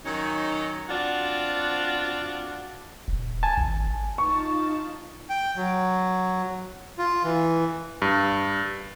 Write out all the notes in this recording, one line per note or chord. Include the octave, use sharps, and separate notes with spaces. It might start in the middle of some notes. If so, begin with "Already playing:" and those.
D#3 F#3 C#4 D#4
C4 D4 F4 F#4
D#1
G#5 A5
G#1
D#4 F4 A5 C#6
G5
F#3
F4
E3
G2